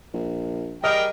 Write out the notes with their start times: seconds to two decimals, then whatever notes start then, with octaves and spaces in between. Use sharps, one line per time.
0.14 A#1
0.84 G3 G#4 A#4 D#5 G5